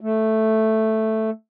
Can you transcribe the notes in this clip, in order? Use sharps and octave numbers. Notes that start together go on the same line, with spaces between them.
A3